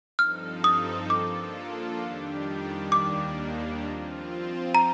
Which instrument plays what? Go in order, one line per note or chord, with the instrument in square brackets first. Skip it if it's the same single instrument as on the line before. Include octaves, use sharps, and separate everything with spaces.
[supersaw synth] G2 F3 C4 D#4 A4 [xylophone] F6
[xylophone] D#6
[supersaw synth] F3 A#3 D4 F4 A4 [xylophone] D6
[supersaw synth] F2 D#3 G3 D4 G4
[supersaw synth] D#2 D#3 G3 A#3 D4 [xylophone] D6
[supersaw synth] F3 C4 F4
[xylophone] A#5